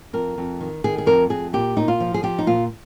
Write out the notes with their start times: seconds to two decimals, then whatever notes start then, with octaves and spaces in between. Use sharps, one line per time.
0.13 F2 A#4
0.38 F2
0.61 D#3
0.84 D#3 G#4
0.98 G#4
1.06 F2 A#4
1.30 F2 G#4
1.53 A#2 G4
1.77 A#2 D#4
1.88 F4
2.00 F3
2.14 G#4
2.23 F3 G4
2.38 D#4
2.47 A#2 F4